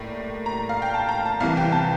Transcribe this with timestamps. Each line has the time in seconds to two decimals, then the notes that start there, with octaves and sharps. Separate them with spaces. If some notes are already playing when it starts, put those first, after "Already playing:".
Already playing: A2 G3 A#3
0.46 A#5
0.69 F5
0.82 G5
0.94 A5
1.09 A#5
1.26 A5
1.40 C2 C3 E3 F5
1.57 G5
1.72 A5